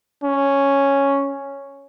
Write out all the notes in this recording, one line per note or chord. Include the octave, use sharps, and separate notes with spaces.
C#4